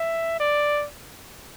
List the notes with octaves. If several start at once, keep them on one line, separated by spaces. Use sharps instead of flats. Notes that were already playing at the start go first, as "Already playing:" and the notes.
Already playing: E5
D5